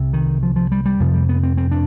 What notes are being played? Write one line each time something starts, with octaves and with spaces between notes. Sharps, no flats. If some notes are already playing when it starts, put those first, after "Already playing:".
Already playing: C2 C3
D#3
F3
F3
G3
G3
F2 C3 F3
G3
B3
C4
C4
D4